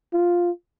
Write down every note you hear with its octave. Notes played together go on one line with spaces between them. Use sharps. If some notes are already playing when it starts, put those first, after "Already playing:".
F4